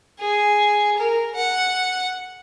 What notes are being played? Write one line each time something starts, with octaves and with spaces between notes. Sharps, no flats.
G#4
A#4
F#5